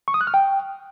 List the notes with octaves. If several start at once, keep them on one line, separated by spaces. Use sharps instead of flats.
C#6
D#6
F#6
F6
G5